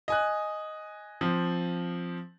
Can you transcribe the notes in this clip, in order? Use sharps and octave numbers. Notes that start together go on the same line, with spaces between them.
D#5 G#5 F#6
F3 C4